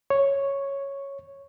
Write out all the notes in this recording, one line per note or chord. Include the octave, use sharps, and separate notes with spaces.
C#5